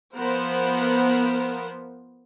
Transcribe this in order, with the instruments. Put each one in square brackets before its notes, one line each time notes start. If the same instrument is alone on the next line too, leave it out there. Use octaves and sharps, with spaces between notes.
[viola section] F3 B3 A#4 C5